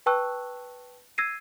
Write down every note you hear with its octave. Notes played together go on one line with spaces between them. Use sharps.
B4 G5 A5 C#6 E6 F#6
E6 G#6 A#6 C7 D#7